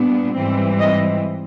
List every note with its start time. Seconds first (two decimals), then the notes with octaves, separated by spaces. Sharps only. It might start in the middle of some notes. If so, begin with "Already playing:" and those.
Already playing: A#2 G3 B3 D4
0.35 G#2 E3 G3 C4
0.79 D#5